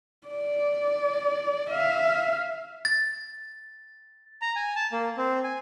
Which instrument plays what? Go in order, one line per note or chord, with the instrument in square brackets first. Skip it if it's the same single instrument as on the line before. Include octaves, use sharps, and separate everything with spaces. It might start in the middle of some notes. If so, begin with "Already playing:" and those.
[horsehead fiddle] D5
E5 F5
[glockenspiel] A6
[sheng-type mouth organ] A#5
G#5
A5
A#3
C4
G#5